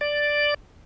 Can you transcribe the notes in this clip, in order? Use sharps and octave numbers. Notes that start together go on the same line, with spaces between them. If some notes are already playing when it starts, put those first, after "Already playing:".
D5